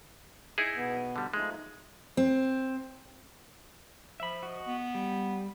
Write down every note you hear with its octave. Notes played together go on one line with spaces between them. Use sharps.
D#4 E4 G#4
B2 B3
D3 G3
F3 G#3 A3 D#4
C4
F3 E5 B5
F#4 D#5
B3
G3